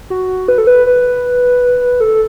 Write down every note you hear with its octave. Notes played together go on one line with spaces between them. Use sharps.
F#4
B4
A4
B4
B4
A4